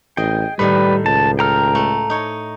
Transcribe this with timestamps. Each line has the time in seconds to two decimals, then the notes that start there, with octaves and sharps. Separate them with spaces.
0.17 A1 G#4 D#5 G5
0.59 A2 D#3 G3 B4
1.06 C#2 A5
1.39 A4 G5 A#5 F6
1.75 A3
2.10 D#4 C#5